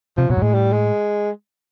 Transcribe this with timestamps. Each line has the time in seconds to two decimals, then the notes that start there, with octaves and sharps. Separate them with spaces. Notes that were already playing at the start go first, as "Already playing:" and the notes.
0.17 C3 F3
0.30 B2 F#3
0.37 G#2
0.42 A2 G#3
0.54 G3
0.73 G#3